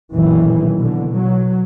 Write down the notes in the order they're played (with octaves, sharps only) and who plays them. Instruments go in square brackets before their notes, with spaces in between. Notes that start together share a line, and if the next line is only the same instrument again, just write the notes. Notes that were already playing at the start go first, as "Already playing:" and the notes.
[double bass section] B1 F#2 A#2 D#3 E3
B2 D3
F#3